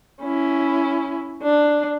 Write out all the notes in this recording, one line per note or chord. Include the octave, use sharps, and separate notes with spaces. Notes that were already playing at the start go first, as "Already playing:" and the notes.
C#4 E4
D4